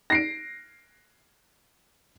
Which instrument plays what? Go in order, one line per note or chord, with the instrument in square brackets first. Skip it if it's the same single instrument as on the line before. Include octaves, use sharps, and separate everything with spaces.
[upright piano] A#6 C7 D7